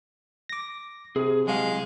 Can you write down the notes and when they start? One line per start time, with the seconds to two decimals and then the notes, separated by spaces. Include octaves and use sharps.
0.49 D6 A#6
1.16 C3 G#4
1.47 F#3 G#3 F5